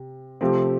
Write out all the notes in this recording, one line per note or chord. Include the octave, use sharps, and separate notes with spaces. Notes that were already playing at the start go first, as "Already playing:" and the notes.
Already playing: C3
C3 F3 A3 C4 G4